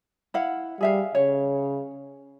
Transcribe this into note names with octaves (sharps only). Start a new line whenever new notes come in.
E4 F5 F#5
G3 G#4 E5 F5
C#3 C#5